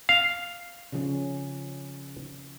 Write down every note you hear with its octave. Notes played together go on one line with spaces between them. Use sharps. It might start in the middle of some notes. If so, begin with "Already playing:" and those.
F5
C#3 F3 C#4